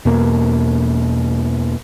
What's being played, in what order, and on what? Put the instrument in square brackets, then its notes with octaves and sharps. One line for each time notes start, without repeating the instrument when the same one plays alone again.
[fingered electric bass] E2 B2 A#3